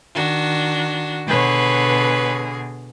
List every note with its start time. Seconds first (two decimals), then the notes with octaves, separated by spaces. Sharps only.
0.15 D#3 D4 F#4
1.28 B2 D3 G#4 B4 C#5